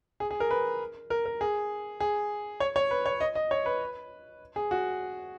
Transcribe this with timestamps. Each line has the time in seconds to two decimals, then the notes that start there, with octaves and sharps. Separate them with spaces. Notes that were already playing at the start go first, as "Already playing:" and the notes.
0.20 G#4
0.31 G#4
0.40 A#4
0.51 B4
1.10 A#4
1.25 A#4
1.41 G#4
2.00 G#4
2.60 C#5
2.76 C#5
2.91 B4
3.06 C#5
3.20 D#5
3.35 D#5
3.51 C#5
3.66 B4
4.56 G#4
4.71 F#4